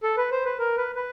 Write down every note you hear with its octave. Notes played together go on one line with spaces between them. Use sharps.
A4
B4
C5
B4
A#4
B4
B4